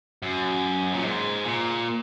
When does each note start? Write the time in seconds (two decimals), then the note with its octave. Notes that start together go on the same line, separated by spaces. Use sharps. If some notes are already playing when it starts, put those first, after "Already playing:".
0.23 F#2
0.93 A#2
1.03 G#2
1.44 A#2